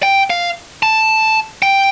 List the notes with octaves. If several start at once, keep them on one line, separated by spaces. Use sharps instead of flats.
G5
F5
A5
G5